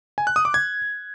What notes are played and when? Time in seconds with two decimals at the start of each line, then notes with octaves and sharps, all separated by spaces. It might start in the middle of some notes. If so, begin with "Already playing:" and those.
0.18 G#5
0.27 F#6
0.36 D#6
0.45 D6
0.54 G#6